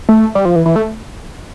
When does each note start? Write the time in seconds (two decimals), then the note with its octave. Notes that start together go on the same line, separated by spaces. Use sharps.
0.09 A3
0.35 G3
0.45 F3
0.56 E3
0.66 E3
0.76 A3